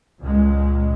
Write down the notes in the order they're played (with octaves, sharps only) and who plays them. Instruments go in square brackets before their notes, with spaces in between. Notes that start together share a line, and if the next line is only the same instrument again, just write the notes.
[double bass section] C#2 A#2 G#3